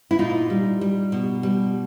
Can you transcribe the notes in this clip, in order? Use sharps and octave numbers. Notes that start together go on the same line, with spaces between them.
E4
A#2 D#4 F4
G3
G3
B2
G3